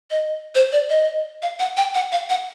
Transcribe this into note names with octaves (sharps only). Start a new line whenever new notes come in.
D#5
C5
D5
D#5
F5
F#5
G5
F#5
F5
F#5